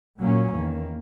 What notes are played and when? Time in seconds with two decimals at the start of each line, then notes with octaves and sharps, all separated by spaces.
0.21 A#2 F#3 A#3 C#4
0.54 E2 D#3 A#3